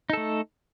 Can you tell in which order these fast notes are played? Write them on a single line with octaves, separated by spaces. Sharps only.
D#4 A4 A3